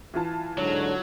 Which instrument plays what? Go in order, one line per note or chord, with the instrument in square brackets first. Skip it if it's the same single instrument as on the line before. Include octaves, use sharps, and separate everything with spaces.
[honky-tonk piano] E3 F4 A5
[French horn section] G#2 D3 C#5 [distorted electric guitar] F#3